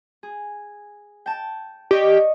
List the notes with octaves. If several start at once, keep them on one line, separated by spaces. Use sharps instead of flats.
G#4
G5 A5
G4 D5 D#5 C#6